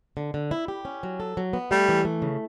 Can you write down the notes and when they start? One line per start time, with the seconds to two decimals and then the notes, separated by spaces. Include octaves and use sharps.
0.17 D3
0.34 D3
0.51 E4
0.68 G4
0.85 C#4
1.03 F#3
1.20 A4
1.37 F#3
1.53 B3
1.71 G3 A3
1.89 E3
2.05 A3
2.22 C#3